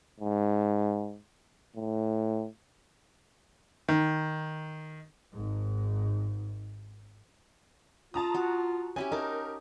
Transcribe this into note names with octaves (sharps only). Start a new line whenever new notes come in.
G#2
A2
D#3
G#1 G#2
F4 A5 A#5 D#6
F#4
C#4 E4 G4 G#5
D#4 A#4 A5